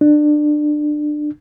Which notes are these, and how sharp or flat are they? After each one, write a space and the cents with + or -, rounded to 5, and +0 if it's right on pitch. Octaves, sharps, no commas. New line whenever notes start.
D4 +25